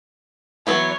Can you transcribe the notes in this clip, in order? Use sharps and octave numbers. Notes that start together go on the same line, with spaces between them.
E3 F#3 B3 C#5